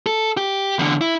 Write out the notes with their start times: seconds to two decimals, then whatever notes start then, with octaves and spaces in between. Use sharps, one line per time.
0.06 A4
0.37 G4
0.79 E2 D3
1.01 E4